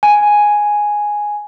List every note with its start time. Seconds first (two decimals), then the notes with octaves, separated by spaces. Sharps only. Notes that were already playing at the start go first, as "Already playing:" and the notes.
0.03 G#5